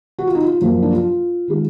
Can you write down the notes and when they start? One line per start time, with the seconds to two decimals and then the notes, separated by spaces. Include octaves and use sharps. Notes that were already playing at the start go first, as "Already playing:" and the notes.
0.19 F#4
0.27 F4
0.35 D#4
0.43 F4
0.61 F#2 F3 A#3
0.83 D4
0.93 F4
1.48 D#3 G#3